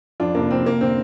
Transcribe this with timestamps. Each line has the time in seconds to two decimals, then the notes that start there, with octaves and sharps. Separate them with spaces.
0.20 F2 D4 F4
0.35 F1 A#3 D4
0.51 F1 C4
0.66 F1 A#3
0.81 D3 C4